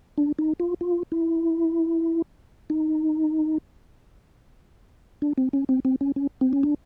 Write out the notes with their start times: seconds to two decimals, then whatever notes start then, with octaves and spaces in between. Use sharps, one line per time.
0.18 D4
0.39 D#4
0.60 F4
0.81 F4
1.12 E4
2.70 D#4
5.22 D4
5.38 C4
5.53 C#4
5.69 C4
5.85 C4
6.01 C#4
6.16 C#4
6.41 C4
6.53 C#4
6.63 D4